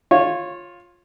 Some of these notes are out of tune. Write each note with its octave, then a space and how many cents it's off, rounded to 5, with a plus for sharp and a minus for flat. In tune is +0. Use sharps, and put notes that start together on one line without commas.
F4 +10 C#5 -15